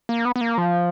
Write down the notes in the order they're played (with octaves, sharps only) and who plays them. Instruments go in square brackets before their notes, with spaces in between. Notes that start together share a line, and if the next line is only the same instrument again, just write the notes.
[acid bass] A#3
B3
B3
A#3
F3